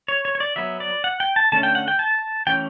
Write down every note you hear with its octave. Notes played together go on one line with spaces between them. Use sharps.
C#5
C#5
C#5
D5
F#3 B3 E5
D5
F#5
G5
A5
D3 A3 C#4 A5
G5
F#5
G5
A5
E3 A3 C#4 G5